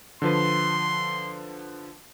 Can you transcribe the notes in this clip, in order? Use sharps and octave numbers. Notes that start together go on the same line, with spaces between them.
D3 F3 B4 C6